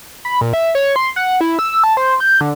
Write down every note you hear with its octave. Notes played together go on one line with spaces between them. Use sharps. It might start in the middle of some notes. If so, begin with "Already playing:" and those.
B5
A#2
E5
C#5
C6
F#5
E4
E6
A5
C5
G6
D3